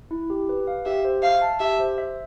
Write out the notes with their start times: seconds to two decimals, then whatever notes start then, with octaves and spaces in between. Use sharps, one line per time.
0.11 E4
0.30 G4
0.49 B4
0.67 F5
0.86 G4 E5
1.05 C5
1.23 E5 F5
1.42 A5
1.60 G4 E5
1.80 C5
1.98 E5